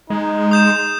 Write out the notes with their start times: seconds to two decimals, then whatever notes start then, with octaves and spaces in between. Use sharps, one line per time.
0.10 G#3 D#4
0.51 D#6 G6 E7